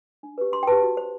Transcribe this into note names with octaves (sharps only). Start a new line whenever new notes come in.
D4
G4 B4
D4 C6
G5
G4 B4 A5
F#4
C5